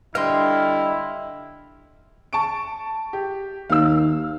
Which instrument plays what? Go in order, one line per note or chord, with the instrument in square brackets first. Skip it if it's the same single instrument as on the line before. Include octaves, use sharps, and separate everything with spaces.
[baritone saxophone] D3 [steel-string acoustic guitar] G3 D#5 G5 [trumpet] E4 [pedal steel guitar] F5 C6
[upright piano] A5 C#6 D7
G4
[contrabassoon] D#2 [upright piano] F5 E6